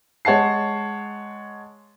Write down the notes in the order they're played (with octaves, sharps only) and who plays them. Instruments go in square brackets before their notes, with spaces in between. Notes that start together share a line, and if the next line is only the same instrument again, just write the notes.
[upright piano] G#3 C#5 F#5 A5 C7